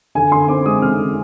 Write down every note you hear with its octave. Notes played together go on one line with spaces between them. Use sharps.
D3 G#5
D3 C6
C4 D6
G#3 D#6
D3 F6
D3